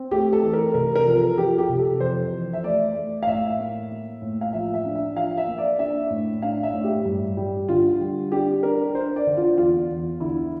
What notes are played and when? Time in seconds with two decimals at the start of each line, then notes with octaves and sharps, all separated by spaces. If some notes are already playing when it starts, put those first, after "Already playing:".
Already playing: C4
0.11 A3 G4
0.33 A4
0.43 E3
0.53 A#4
0.74 C3 A#4
0.95 A#4
1.06 F3 A#4
1.16 A4
1.38 F3 G4
1.58 G4
1.69 C3
1.79 A4
2.00 F2 C5
2.32 E3
2.53 E5
2.64 A3 D5
2.95 A3
3.23 F5
3.27 A2 E5
3.58 A#3
3.90 A#3
4.22 A2
4.41 F5
4.53 F3 E5
4.74 E5
4.85 D4
4.95 E5
5.16 F3 F5
5.37 E5
5.47 A#3
5.58 D5
5.79 D4 E5
6.10 A2
6.42 D4 F5
6.63 E5
6.74 A2
6.84 G4
7.05 G2
7.37 G3
7.68 D3 F4
8.00 G3
8.32 D4 G4
8.63 D4 A#4
8.95 D4 C5
9.16 D5
9.27 D3
9.37 F4
9.58 E2 F4
9.90 E2
10.20 D3 E4